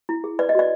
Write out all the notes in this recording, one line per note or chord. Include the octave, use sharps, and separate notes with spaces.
E4
G#4
B4 D5
D#5
F#4 D5